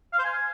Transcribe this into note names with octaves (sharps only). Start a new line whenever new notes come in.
F5
C5
G#5